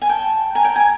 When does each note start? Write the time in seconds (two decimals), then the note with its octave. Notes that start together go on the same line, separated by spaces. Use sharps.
0.02 G#5
0.09 G5 A5
0.53 G#5 A#5
0.65 G5
0.76 G#5